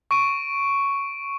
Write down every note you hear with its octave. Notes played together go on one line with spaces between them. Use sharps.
C#6 D7 D#7